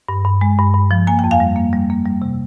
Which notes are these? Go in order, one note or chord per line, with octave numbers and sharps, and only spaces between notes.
G2
G2
G#3
G2
G2
F3
A#3 G#5
G5
F2
F5 G#5
G3
A#3
G3
A#3
G3
C3